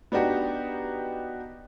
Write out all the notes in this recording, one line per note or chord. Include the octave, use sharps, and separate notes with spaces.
B3 D4 D#4 F#4 G4